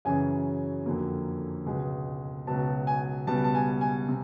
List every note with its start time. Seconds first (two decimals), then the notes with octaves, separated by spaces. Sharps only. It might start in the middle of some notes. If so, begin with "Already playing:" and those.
0.05 F#2 C#3 E3 G#5
0.86 F2 D3 F#3 A#3
1.66 C#2 B2 G#3 B3
2.47 C#2 B2 F#3 B3 A5
2.87 G#5
3.27 C#2 B2 G3 B3 A5
3.44 A5
3.55 G#5
3.81 G#5
4.08 C3